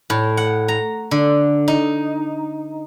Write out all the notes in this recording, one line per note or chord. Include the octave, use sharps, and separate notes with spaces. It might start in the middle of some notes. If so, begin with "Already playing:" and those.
A2
F#5
A#5
D3
D#4